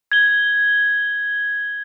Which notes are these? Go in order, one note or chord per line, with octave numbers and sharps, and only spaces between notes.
G#6 G7